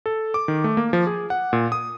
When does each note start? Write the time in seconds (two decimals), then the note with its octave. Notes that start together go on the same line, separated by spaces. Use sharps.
0.06 A4
0.34 D6
0.48 D#3
0.64 A3
0.77 A#3
0.93 F3
1.07 G#4
1.30 F#5
1.53 A#2
1.72 D#6